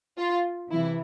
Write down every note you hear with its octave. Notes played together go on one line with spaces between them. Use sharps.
F4
C3 E3 E4